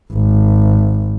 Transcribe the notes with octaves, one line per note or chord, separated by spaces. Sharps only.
G#1